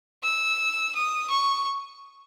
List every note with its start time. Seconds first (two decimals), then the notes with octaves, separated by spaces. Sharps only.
0.23 E6
0.95 D#6
1.30 C#6